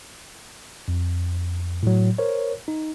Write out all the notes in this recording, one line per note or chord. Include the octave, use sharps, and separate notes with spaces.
F2
A2 F#3
A#4 C5 C#5
D#4